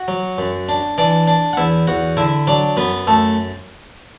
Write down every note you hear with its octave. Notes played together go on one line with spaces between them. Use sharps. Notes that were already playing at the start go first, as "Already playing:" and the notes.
Already playing: F#4 F#5
F#3
F#2
D4
E3 D4 D5
D4
F#5
E2 E4 E5
E2 F#4 F#5
D3 E4 E5
F#3 D4 D5
F#2 B3 B4
F#2 A3 A4